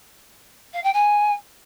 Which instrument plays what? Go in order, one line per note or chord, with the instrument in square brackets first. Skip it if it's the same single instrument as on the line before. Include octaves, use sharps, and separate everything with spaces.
[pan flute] F5
G5
G#5